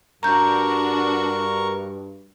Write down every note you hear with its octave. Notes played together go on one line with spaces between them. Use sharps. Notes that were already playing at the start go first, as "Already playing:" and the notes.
G2 D4 F#4 A#4 A#5 C#6 G6